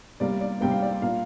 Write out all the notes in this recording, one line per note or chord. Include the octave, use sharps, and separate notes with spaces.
C3 G3 A#3 D5
D5
C3 G3 A#3 G5
F5
D5
A#2 A#3 F5